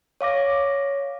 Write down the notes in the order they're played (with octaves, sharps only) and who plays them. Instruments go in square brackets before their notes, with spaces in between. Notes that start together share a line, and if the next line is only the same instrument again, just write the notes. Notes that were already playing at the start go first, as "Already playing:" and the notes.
[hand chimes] C#5 F5 D6 A#6